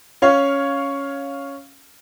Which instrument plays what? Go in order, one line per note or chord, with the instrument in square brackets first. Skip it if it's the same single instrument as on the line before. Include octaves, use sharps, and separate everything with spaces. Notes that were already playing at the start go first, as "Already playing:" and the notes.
[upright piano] C#4 C#5 F5